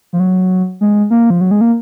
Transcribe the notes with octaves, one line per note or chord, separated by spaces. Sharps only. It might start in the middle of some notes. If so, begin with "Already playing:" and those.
F3
F#3
G#3
A#3
F3
F#3
G#3
A#3